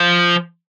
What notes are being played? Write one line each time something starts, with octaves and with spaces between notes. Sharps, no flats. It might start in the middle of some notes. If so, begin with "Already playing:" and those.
Already playing: F3